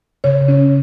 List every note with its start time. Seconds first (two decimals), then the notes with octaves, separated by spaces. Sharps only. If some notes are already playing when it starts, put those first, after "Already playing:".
0.24 C#3 C#5
0.48 C#4